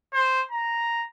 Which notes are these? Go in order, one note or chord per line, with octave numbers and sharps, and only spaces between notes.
C5
A#5